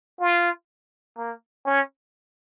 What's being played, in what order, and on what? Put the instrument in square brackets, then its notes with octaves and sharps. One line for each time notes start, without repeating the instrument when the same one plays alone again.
[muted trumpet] F4
A#3
C#4